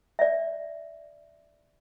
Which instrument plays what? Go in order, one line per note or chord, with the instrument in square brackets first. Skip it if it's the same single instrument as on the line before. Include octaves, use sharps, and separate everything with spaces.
[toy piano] D5 E5